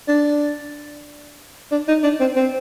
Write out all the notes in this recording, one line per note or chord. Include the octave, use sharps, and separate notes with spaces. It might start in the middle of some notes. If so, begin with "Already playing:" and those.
D4
D4
D#4
D4
C4
C4